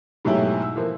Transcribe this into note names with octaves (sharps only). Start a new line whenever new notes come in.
G#2 B2 F#3 A3 E4 G4
E6
E3 F3 A#3